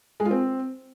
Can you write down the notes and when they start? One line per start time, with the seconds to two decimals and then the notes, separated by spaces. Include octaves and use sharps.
0.20 G#3
0.25 F4
0.31 C4